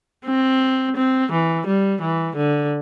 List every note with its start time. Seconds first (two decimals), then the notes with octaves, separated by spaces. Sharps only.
0.26 C4
0.96 C4
1.32 E3
1.66 G3
2.02 E3
2.36 D3